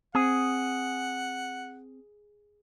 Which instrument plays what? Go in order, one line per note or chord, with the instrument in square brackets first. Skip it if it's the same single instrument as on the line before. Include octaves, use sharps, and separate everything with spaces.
[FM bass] C4 [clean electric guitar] G#4 [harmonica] F#5